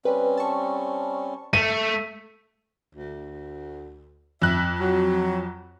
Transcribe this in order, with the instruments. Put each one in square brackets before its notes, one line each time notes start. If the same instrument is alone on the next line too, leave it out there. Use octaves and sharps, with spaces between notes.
[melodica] G3 C4 C#4 [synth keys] B4
[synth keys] A5 C#6
[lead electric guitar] A3 [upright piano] D#7
[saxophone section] D2
[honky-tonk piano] F2 F#6 [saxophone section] E5
[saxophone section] F#3